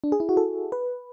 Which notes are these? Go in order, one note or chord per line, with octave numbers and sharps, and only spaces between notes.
D4
G#4
E4
F#4
A4
B4